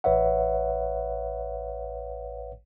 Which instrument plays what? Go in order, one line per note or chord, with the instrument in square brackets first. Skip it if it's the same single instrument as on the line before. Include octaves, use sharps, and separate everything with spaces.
[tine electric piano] A1 B4 C#5 E5 F#5